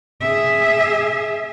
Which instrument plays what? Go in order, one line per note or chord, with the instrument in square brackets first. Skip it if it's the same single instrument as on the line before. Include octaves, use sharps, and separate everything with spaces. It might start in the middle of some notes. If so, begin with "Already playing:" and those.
[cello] G#4 E5